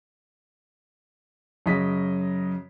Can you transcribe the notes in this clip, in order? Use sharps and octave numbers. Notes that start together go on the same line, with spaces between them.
F#2 C#3 F#3 D#5 B6